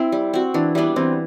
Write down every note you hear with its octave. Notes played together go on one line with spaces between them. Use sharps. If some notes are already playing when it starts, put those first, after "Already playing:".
Already playing: C4 E4
G3
C4 F#4
E3 D4
G3 B3 D4 E4
E3 C4